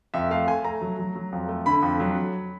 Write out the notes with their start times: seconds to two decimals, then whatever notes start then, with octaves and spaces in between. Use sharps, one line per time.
0.14 F2 E5
0.31 A3 F5
0.47 A3 G#5
0.64 A3 A#5
0.81 F#3
0.99 F#3
1.16 F#3
1.32 F2
1.49 A3
1.66 D3 B5
1.82 F2
2.00 F#3